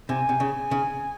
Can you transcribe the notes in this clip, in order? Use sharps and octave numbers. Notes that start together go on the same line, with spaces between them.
C3 G#5
C3
C#3
C#3